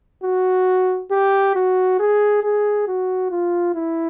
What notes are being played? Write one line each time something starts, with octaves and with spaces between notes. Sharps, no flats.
F#4
G4
F#4
G#4
G#4
F#4
F4
E4